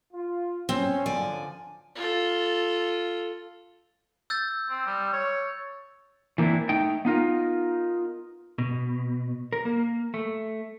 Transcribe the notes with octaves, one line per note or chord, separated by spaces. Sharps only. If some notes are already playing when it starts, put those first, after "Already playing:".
F4
C4 C#4
D3 F3 D5 G#5
F4 A4
E6 G6 A6
C4
G3
C#5
E3 A#3 C4 D4 E4
A3 D#4 G5
B3 D#4 F4 A#4
B2
A#4
A#3
A3